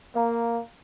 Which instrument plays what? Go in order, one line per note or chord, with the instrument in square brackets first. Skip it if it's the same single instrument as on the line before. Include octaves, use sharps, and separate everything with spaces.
[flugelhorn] A#3 [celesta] F5 A#5